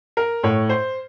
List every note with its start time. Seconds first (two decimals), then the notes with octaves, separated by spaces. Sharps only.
0.17 A#4
0.43 A2 C#5
0.69 C5